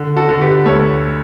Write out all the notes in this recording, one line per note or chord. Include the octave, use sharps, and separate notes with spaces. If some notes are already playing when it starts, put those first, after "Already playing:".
Already playing: D3
F#4 A4
D3
G4 B4
D2 A4 C#5